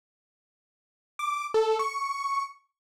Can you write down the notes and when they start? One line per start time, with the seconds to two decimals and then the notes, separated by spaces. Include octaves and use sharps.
1.19 D6
1.54 A4
1.79 C#6